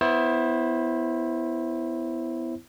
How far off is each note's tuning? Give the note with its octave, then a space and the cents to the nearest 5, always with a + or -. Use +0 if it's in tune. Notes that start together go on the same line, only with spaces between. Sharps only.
B3 +15 E4 +0 C5 +30